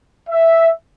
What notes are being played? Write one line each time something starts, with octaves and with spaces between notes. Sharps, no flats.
E5